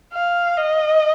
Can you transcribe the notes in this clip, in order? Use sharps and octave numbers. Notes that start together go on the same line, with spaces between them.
F5
D#5